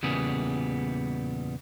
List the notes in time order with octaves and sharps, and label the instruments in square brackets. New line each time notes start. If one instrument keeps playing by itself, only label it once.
[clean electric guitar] E2 A#2 C#3 G3 B3 G#4